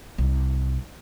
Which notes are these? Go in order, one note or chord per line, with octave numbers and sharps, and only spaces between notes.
C2